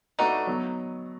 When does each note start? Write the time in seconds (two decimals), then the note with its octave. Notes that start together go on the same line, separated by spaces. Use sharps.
0.19 A3 D4 D#4 F#4 B4
0.47 F#3 B3